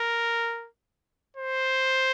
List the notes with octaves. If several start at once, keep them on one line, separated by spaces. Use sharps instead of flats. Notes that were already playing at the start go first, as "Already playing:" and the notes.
Already playing: A#4
C5